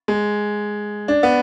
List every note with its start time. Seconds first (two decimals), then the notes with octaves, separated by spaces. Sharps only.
0.08 G#3
1.08 D4
1.23 B3